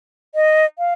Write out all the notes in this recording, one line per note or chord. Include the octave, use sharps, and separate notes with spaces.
D#5
F5